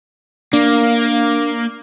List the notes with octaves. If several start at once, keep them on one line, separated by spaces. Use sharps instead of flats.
A#3 D4